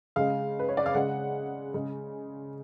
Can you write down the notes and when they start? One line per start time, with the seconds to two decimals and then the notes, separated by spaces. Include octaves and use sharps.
0.16 C#3 G#3 F5
0.59 B4
0.69 C#5
0.77 D5
0.86 F5
0.95 C#3 G#3 F#5
1.74 C#3 G#3